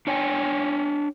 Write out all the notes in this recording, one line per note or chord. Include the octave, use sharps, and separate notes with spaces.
D4 C#5 G5 G#5